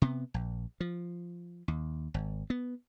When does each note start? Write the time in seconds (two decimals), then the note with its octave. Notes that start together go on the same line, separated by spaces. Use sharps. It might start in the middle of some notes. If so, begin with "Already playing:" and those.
0.02 C3 B3
0.34 A#1
0.80 F3
1.68 D#2
2.14 G#1
2.50 B3